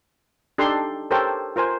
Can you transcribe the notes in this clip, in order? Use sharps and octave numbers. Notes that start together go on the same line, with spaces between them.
D4 D#4 G4 A4 C6
G4 A4 A#4 C5 C#5 G5
F4 A#4 C5 G#5